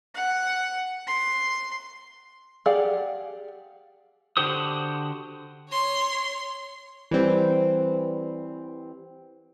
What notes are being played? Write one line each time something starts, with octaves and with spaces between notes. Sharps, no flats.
F#5
C6
G4 G#4 D5 F5 F#5
D3 F#4 G4 C5 D#6
C#5 C6
E3 G3 C4